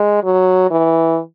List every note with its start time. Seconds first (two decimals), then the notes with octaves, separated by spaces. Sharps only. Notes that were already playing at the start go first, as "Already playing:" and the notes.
Already playing: G#3
0.23 F#3
0.71 E3